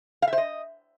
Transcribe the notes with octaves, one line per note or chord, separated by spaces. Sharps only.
F5
E5
C5
D#5